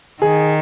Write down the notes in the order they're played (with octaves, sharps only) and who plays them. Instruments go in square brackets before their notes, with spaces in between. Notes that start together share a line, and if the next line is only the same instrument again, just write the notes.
[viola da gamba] D#3 [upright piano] G#4